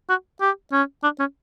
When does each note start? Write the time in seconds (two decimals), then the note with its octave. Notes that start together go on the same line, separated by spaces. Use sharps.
0.09 F#4
0.41 G4
0.72 C#4
1.03 D4
1.19 C#4